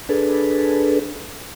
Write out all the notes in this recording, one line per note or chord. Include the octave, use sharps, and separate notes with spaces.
D4 G#4 A4 B4